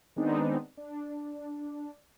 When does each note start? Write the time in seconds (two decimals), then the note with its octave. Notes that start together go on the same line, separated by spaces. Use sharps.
0.16 D#3 G#3 B3 C4 D4 D#4
0.77 D4